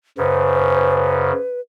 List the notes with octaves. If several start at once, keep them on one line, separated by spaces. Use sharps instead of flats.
F#2 C#3 B4 C5